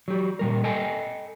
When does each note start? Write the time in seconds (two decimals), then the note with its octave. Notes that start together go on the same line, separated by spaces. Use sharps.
0.08 F#3 G4
0.39 A#2 G3 A#4
0.64 A4 D#5 G5 G#5